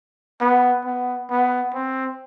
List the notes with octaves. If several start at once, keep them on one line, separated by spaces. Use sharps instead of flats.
B3
B3
B3
C4